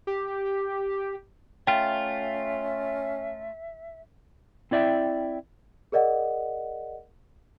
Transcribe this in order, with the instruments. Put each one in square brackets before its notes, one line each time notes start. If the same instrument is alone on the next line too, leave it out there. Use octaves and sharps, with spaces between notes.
[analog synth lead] G4
[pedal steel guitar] A3 F4 [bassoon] C#4 [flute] E5 [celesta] G5
[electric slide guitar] C4 E4 D5 E5 G5
[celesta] G#4 A#4 D5 D#5 F#5